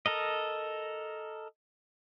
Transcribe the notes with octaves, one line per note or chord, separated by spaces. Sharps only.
A4 A#4 D#5